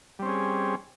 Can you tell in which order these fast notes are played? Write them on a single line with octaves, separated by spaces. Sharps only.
G3 C4 C#4 G#4